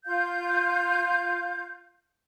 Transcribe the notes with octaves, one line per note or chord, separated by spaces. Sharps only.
F4 F5 G6